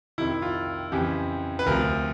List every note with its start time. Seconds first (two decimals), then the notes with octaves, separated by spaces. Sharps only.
0.18 F2 C3 D#3 E4
0.42 F4
0.92 F2 C#3 E3 G4
1.59 B4
1.66 D2 C3 F3 A#4